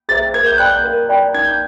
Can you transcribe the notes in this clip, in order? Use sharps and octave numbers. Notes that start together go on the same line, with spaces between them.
G#4 C5 E5 A6
A#4 G#6
G6
D5 G5 B5 F#6
G6
A#4
D5 G5 B5
D#4 G#6
G6